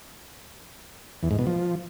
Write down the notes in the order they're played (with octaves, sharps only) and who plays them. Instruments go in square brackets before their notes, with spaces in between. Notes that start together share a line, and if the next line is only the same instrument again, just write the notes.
[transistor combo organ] E2
G#2
B2
F3